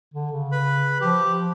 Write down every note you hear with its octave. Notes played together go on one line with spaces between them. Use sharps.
D3
C#3
B4 B5
F3 G4